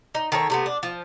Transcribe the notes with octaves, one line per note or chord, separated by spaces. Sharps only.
D#4
D#3 A4 C#5
C3 A3 B3
D4
F3